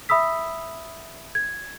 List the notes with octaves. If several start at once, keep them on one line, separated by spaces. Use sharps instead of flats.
E5 B5 D#6 E6 B6
G#6